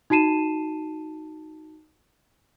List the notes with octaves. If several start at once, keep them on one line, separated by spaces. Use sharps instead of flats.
D#4 F#4 A5 C7 D#7 E7